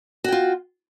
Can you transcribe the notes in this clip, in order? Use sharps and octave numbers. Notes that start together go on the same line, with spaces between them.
F4 F#4 G5